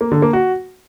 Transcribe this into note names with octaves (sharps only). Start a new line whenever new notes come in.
A#3
D3
A#3
F#4